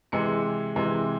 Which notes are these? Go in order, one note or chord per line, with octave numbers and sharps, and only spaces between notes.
C3 E3 G#3 C#7
C3 E3 G#3